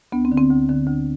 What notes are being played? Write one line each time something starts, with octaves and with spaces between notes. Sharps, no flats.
D2 B3
C4
D3
C4
D2
D3
D2